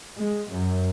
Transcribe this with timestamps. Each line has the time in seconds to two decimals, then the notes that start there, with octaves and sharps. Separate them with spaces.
0.18 G#3
0.52 F#2